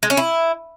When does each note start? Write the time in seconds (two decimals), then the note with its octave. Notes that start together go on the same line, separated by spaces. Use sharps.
0.03 G#3
0.10 C#4
0.17 E4